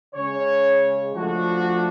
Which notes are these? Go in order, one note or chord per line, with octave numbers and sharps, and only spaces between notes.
C#3 G#3 C#4 C#5
F3 A3 D4 F#4